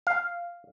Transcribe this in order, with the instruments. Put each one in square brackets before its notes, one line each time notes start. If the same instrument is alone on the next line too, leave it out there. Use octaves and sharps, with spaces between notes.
[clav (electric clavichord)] F5